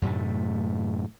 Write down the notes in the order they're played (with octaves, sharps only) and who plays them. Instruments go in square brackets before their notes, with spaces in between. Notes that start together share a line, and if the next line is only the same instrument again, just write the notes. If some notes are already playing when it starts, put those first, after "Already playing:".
[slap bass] F#2 A2 C3 A3